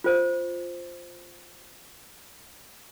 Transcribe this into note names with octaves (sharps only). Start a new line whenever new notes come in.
F4 C5